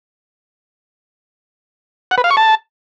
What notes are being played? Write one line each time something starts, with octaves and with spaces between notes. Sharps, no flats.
F#5
B4
F5
C#6
A5